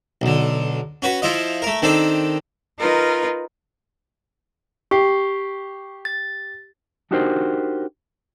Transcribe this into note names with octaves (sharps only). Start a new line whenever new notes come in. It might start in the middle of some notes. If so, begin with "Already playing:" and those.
B1 D3
C#4 F#4 B4
F3 E4 F4 D#5
A3 A#4
D#3 C4 D4 A4
D#4 F4 A#4 B4
G4 C#6 C7
A6
D4 D#4 F#4 G4 A#4 C5